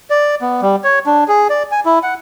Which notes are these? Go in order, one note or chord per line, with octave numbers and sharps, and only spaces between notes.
D5
B3
G3
C#5
D4
G#4
D5
G#5
E4
F#5